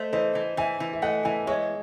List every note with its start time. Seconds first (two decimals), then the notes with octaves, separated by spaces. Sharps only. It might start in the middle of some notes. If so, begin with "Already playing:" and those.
Already playing: A3 C5 D#5
0.13 E3 C5 D#5
0.35 E3
0.57 E3 E5 G#5
0.80 E3
0.93 E5
1.02 A3 D#5 F#5
1.25 E3 E5 G#5
1.47 G#3 C#5 E5